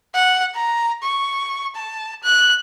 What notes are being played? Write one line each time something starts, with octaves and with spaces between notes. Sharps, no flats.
F#5
A#5
C#6
A5
F#6